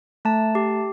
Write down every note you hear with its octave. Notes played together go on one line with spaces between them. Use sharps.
A3 A5
G4